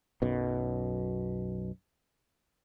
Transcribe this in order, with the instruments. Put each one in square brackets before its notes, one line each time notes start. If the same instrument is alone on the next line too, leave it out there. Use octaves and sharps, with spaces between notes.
[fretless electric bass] B1 F#2 B2